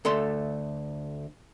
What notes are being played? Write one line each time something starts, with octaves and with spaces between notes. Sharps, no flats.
D2 A3 A4 C6